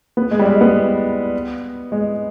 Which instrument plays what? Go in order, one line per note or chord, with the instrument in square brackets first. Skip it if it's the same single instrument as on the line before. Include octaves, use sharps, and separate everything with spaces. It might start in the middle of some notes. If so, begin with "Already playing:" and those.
[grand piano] B3
G#3
G3
G#3
B3
G#3